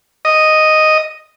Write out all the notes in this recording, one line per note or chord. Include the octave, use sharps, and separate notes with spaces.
D#5